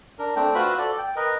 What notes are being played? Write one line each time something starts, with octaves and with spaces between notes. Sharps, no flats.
D4 A#4
A3 C4 D4 G5
F4 F#4 B4 C5 E5 B5
A4 D5
G5
A#4 B4 D#5